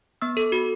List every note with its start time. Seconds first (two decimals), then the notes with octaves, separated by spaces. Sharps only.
0.22 B3 E6
0.37 A4
0.52 F#4